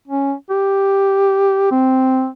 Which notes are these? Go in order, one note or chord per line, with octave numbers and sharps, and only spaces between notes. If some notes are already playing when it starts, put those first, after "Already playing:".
C#4
G4
C4